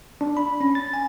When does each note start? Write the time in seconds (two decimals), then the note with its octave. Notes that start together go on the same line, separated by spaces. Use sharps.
0.21 D4
0.37 B5
0.61 C#4
0.75 A6
0.94 G#5